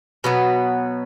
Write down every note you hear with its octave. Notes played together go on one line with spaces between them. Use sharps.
B2 F#3 B3